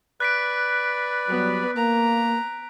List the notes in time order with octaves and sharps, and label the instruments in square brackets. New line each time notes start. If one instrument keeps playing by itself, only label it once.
[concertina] B4 D5 [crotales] F#6 B6 D7
[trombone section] F#3 G3 [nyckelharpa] B3
[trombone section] A#3 [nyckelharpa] A#5